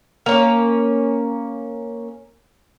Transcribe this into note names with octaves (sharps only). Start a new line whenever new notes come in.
A#3 C#4